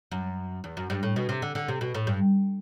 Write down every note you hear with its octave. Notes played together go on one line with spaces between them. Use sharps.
F#2
E2
F#2
G2
A2
B2
C3
D3
D3
C3
B2
A2
G2